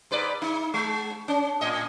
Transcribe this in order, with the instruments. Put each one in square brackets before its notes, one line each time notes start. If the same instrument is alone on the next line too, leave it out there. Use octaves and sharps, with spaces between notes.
[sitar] G#2 B4 D5
D#4
G#3
C#4
A2 D#5